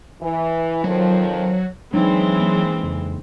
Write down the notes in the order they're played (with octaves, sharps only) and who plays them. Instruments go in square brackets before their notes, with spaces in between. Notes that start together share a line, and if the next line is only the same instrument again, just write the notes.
[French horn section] E3
[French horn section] F2 D#3 F3 [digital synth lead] F#3
[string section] E3 G#3 C4 [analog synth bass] F#3 [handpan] D4 D#4
[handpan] A#3
[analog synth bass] F2 [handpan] C#3